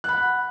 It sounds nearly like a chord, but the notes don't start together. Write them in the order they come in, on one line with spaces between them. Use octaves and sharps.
F#6 B5 F#5